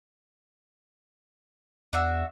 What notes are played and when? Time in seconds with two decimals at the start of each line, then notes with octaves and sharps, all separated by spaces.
1.93 E2 D4 F#4 E5